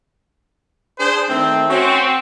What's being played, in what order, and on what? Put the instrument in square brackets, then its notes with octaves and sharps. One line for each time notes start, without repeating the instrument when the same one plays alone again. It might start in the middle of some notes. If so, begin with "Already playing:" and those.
[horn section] D4 G#4 C5
D#3 A3 C4
[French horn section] C4 [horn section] C#4 F#4